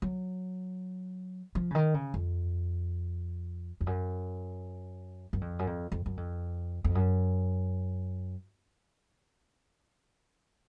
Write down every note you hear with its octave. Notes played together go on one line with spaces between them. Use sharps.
F#3
F3
C#3
D#3
C#3
F2
F2
F#2
F#2
F2
F#2
F2
F2
F#2
F2
F2
F#2